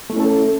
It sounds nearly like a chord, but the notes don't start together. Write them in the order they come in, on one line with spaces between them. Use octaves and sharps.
A3 E4 C#4 A4